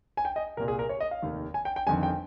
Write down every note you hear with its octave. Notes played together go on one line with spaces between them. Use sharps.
G#5
G5
D#5
C2 A#2 A#4
G#4
A#4
C#5
D#5
F5
F1 D#2 D#3
G#5
G5
G5
G1 F2 D#3 G#5
G5